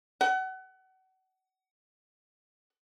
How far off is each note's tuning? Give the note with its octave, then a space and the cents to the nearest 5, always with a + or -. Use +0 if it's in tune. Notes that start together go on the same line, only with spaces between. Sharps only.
F#5 +30